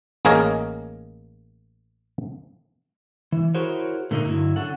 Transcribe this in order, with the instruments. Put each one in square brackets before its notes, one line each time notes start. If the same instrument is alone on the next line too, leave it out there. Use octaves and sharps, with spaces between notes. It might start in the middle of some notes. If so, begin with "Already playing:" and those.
[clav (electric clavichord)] A1 A#3 G#4 A#4 C#5 D#5
[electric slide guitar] E3
E4 F#4 G#4 A#4 C5 C#5
A#2 D3 A3 A#3 D4 D#4
G2 D3 F#3 E4
D3 C#4 A4 F#5